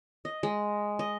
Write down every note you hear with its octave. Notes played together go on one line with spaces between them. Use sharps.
D#5
G#3
D#5